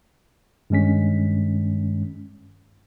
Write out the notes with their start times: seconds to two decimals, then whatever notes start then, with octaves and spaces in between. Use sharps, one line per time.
0.70 G2 D#3 G#3 C#4 B6